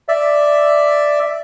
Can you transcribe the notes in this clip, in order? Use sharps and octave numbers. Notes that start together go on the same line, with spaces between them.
D5 E5